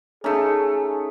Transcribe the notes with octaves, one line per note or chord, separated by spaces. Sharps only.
A3 C#4 D#4 G#4